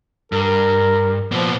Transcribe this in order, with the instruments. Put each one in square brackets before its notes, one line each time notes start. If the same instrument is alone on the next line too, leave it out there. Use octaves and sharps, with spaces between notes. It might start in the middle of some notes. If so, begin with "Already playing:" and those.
[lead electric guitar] G2 [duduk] A#4
[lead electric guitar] A#2 B3 [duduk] F3